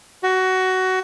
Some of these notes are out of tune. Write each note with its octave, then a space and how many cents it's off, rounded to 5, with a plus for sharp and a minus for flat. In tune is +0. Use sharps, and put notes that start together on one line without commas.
F#4 +15